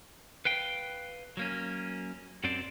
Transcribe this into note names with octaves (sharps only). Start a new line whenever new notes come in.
B4 F5 G5
F#3 A#3 C#4
F#2 F#3 C4 C5 D5